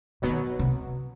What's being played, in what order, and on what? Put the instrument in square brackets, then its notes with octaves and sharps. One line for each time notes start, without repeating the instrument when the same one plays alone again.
[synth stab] B2 F#3 B3 [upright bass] D#3
[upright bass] C3